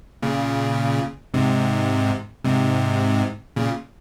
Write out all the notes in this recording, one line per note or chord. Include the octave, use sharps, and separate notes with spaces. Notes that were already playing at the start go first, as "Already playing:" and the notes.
A#2 C#3
G#2 C3
G#2 C3
A#2 C#3